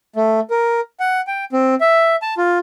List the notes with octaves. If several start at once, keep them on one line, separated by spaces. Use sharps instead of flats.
A3
A#4
F#5
G5
C4
E5
A5
F4